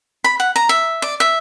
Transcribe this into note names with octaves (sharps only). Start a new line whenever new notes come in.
B5
F#5
A#5
E5
D5
E5